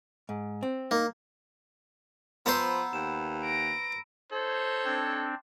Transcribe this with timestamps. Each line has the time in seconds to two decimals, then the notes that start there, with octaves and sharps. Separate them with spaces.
0.29 G#2
0.63 C4
0.91 A#3 D#4
2.46 F3 B3 C5 A#5 B5 E6
2.93 D#2 E7
3.45 A#6 D7
4.32 D#4 A4 C5 C#5
4.85 C4 D4